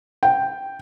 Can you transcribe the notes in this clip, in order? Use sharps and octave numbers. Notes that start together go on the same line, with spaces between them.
G5